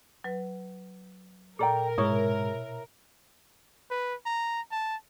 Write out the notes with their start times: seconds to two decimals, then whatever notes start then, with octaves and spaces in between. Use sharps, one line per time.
0.24 F#3 B4
1.59 A#2 A4 A#4 D5 G5 A#5
1.98 G#2 B2 G#3 E4 C#5 C#6
3.91 B4
4.26 A#5
4.71 A5